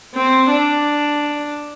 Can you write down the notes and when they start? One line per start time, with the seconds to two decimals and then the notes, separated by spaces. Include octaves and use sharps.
0.15 C4
0.50 D4